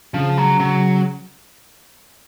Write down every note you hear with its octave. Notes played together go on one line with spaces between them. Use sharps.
C#3 F3
F#3
C#3 F#3